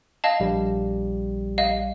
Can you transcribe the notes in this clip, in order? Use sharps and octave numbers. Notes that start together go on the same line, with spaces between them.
D#5 F5 A5
A#1 G3
D#5 F5